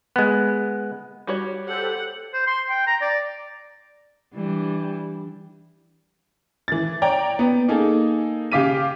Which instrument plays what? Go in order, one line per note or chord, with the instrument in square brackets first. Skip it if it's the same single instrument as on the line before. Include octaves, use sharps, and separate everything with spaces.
[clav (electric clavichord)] G#3 B3
[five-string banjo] G3 F#4 C#5
[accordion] G4 A4 C5 [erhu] F#5
[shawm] C5
C6
G5
A#5
D5
[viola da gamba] E3 G3 D4
[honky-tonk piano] E3 A6
C#5 D5 G5 A#5
B3
A#3 D#4 G#4 A4
C#3 G4 F5 D6 B6 D#7